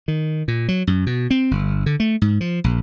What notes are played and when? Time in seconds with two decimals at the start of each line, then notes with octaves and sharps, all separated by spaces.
0.08 D#3
0.48 A#2
0.68 F#3
0.87 F#2
1.07 B2
1.31 C4
1.51 G1
1.86 D3
2.00 A3
2.22 G#2
2.41 F3
2.64 A#1